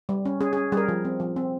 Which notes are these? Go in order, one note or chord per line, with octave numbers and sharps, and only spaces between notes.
G3
C#4
C#4 G#4
C#4 G#4
G3 G#4
A#4
F3
C4
F3
C4